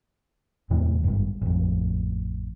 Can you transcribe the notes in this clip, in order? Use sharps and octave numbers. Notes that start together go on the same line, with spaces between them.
E2 A2 C3 E3
G#1 G2
A1 F2